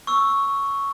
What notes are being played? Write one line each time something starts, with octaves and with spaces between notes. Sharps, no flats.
C#6 E6